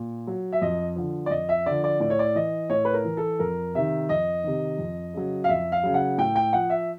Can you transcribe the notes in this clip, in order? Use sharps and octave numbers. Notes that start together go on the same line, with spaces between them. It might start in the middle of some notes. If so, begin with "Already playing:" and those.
Already playing: A#2
F#3
E5
F2 D#5
D3 F3
D5
F2 D#5
E5
D3 F3 D5
D5
A2 D5
C#5
D5
E3 D#5
A2 C#5
B4
A#4
E3
A4
F2 A#4
C3 D#3 E5
F2 D#5
C3 D#3
F2
C#3 F#3
F5
F2 E5
F5
C#3 F#3
F#5
A2 G5
G5
F3 F#5
E5